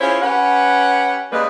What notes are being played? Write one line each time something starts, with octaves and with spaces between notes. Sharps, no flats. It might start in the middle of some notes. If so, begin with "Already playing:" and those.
C#4 E4 F4 G#4 C5 C#5
C#4 G4 B4 F#5
C#3 G3 G#3 A#3 B4